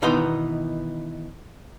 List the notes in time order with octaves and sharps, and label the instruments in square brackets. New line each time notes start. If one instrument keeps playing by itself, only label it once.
[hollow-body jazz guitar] B2 D#3 E3 B3 D#4 C6